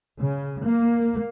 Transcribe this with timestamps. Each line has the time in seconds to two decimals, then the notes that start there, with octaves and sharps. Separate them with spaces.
0.20 C#3
0.64 A#3